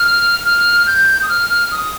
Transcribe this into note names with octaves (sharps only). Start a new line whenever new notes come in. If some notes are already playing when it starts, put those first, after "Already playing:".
Already playing: F6
F6
G6
D#6
F6
F6
D#6